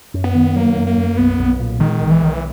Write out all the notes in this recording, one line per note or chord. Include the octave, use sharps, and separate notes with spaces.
F#2
B3
D#3
F#3 A#3
F#2
A#3
F#2
B1 B3
B1
A#2
D#3 G#3
B1
E3
B1 D#3
E3